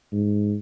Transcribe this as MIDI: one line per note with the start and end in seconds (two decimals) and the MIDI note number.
0.12 0.56 44